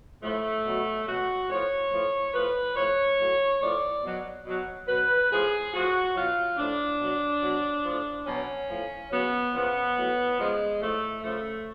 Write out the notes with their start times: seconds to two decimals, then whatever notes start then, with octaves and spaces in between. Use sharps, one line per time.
0.22 A2 F3 A3
0.65 B2 F#3
1.06 B2 F#3 F#4
1.49 A2 F3 C#5
1.91 A2 F3
2.34 A2 F3 B4
2.76 A2 F3 C#5
3.18 A2 F#3
3.61 A2 F3 D5
4.04 B2 F#3
4.46 B2 F#3
4.88 B2 F#3 B4
5.30 A2 F3 G#4
5.72 A2 F3 F#4
6.15 B2 F#3 F4
6.57 A2 F3 D4
7.00 B2 F#3
7.42 B2 F#3
7.85 A2 F3
8.27 B2 F#3 C#4
8.69 A2 F3
9.12 C#3 F#3 B3
9.54 C#3 F3 B3
9.96 A2 F#3
10.38 C#3 F3 G#3
10.81 A2 F3 A3
11.23 C#3 F3 A3